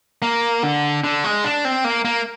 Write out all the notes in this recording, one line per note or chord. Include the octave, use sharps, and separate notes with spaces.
A#3
D3
D3
G#3
D4
C4
A#3
A#3